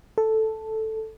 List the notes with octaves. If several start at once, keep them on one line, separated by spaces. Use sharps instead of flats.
A4